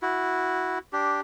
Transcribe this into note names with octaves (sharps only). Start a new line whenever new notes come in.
E4 F#4
D4 G4